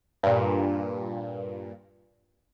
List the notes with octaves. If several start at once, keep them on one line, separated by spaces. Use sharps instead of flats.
G2 A#2